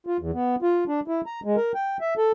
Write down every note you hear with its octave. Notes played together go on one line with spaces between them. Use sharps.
F4
E2
B3
F4
D4
E4
A#5
G#3
A#4
G5
E5
A4